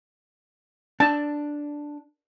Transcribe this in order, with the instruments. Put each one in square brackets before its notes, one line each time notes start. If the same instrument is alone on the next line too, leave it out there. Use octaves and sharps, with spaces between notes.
[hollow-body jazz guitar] D4 [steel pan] A5